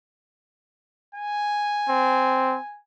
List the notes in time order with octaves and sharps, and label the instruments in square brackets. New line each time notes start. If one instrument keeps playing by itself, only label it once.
[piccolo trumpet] G#5
[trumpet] C4